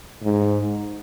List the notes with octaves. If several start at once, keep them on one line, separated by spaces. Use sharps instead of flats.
G#2